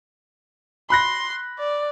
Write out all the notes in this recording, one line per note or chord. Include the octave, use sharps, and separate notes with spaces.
B5 C6 F#6 A#6
D5